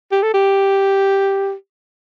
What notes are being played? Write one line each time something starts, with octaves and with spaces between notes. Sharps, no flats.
G4
A4
G4